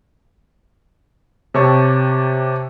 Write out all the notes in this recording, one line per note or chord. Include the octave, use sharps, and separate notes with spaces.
C3 G4 C#5 A5 C#6